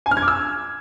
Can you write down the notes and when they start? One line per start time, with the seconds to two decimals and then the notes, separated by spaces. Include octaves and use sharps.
0.06 G#5
0.11 F6
0.17 G#6
0.22 D6
0.28 E6